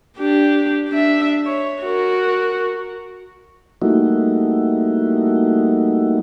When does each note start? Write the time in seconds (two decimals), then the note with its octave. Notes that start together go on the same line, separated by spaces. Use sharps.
0.18 D4 G4
0.89 D4 E5
1.46 C#5
1.84 F#4 A#4
3.82 G3 A3 A#3 D#4 E4 F#4